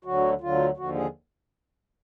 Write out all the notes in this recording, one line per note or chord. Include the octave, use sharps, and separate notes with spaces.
D2 D3 F#3 F#4
D2 D3 F#3 F4
D#2 D3 F3 F#4
G#4